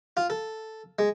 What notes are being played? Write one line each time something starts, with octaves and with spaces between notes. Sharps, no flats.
F4
A4
G#3